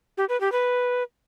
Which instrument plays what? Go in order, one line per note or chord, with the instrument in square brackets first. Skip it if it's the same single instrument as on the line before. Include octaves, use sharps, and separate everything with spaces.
[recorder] G4
B4
G4
B4